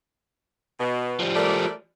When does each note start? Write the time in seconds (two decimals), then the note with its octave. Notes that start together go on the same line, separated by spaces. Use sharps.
0.79 B2
1.20 F3 G3
1.35 A3 A#4 D5